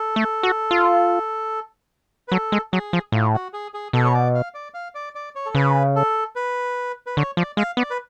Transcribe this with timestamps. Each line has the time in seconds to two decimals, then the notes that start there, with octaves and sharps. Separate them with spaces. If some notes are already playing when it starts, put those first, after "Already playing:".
Already playing: A4
0.16 A3
0.43 F#4
0.71 F4
2.28 B4
2.32 F#3 A4
2.52 G#3
2.73 F#3 G#4
2.93 F3
3.12 A2 F4
3.34 F#4
3.53 G#4
3.74 G#4
3.93 B2 A4
4.05 C#5
4.14 D5
4.34 F5
4.54 D5
4.74 F5
4.95 D5
5.15 D5
5.35 C#5
5.46 A4
5.55 C#3 B4
5.96 A4
6.36 B4
7.06 B4
7.17 D3 C#5
7.37 F3 D5
7.57 G#3 F5
7.77 B3 D5
7.90 B4